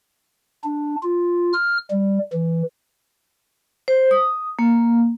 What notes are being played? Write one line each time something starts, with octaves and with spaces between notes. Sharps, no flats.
D4
F4
F6
G3
E3
C5
D#6
A#3